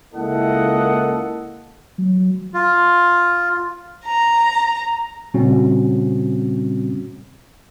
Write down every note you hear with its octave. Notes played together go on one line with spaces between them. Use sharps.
C#2 A#3 E4 A4 D#5 F#5
F#3
F4
A#5
A#2 C#3 G3 C4 C#4 F#4